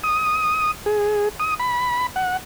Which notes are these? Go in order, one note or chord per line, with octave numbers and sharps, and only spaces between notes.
D#6
G#4
D#6
B5
F#5